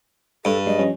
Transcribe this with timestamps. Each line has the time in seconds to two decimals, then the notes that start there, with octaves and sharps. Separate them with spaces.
0.45 G2 A4
0.67 F#3 G#3 D4 D#5
0.79 F3 G3 C#4